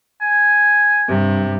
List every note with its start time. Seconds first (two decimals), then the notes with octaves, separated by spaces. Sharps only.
0.21 G#5
1.07 G2 C3